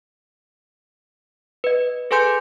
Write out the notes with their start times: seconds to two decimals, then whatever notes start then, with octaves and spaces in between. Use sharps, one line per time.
1.64 B4 D#5
2.11 G#4 A4 B4 G#5 C6 G6